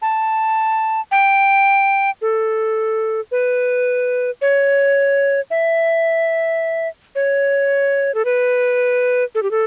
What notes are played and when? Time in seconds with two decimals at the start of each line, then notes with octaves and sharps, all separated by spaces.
0.02 A5
1.11 G5
2.22 A4
3.32 B4
4.42 C#5
5.51 E5
7.15 C#5
8.15 A4
8.25 B4
9.35 A4
9.43 G4
9.51 A4